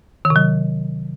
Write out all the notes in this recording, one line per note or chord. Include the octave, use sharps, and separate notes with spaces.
D#3
C3
F#3